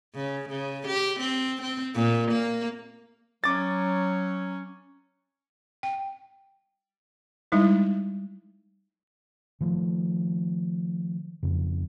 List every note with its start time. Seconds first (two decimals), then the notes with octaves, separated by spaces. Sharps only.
0.15 C#3
0.49 C#3
0.87 G4
1.20 C4
1.62 C4
1.94 A#2
2.31 A#3
3.44 F#3 C#4 D6 A6
5.83 G5
7.52 G3 G#3 D#4 E4
9.61 D#3 F3 A3
11.43 F2 C#3